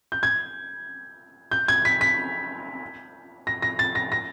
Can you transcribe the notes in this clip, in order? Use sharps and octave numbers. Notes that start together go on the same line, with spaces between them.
G6
G#6
G6
G#6
B6
B6
A#6
A#6
A6
A#6
A#6